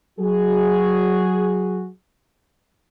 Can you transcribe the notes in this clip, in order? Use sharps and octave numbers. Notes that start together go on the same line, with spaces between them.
F#3 F#4 G#4